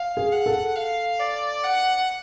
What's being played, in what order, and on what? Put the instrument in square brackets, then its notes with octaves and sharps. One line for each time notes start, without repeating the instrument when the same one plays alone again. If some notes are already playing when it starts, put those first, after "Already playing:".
Already playing: [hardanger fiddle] F5
[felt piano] G#4
[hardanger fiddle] F#5
[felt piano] A4
[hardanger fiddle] F5
D5
F#5